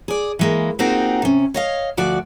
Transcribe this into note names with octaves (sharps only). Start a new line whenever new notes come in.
G#4 D5
E3 G#3 A#3
A#3 C4 D#4 F4 F#4 G#4
C3 C#4
C#5 D#5 F5
D2 F3 F#4 D5